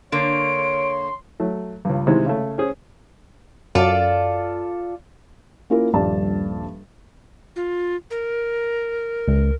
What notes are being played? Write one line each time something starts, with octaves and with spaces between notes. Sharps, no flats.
D3 A#3 C#5 C6 D7
F#3 A3
C#2 G2
C3 D#3 E3 G#3
C#3 A3
C#4 G#4 C5
F#2 F4 A4 D5
A#3 C#4 E4 F4 A#4
D#1 A#1 G2 D5 A5
F4
A#4
C#2